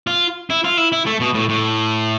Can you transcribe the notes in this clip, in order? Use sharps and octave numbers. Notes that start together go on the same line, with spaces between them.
F4
E4
F4
E4
E4
A3
B2
A2
A2